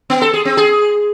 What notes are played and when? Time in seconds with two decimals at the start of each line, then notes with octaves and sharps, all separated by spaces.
0.10 B3
0.22 A4
0.33 G#4
0.45 C4
0.57 G#4